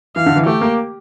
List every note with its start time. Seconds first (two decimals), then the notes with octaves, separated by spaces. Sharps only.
0.16 E3 F5
0.26 D3
0.36 E3
0.46 A3 G4
0.61 A#3